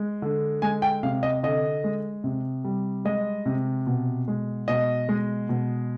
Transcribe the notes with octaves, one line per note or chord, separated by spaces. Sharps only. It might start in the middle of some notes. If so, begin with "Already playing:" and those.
Already playing: G#3
D3
G#3 G#5
G5
C3 F5
D#5
D3 D#5
G#3
C3
G3
G#3 D#5
C3
B2
G#3
B2 D#5
G#3
B2